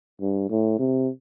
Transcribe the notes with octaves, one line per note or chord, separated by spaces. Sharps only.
G2
A2
C3